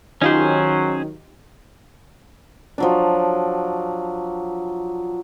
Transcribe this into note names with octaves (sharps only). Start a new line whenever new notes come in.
D#3 F#3 C#4 D#4 F4 G4 G#4 C5
F3 F#3 D4